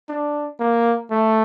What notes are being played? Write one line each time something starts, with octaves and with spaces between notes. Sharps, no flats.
D4
A#3
A3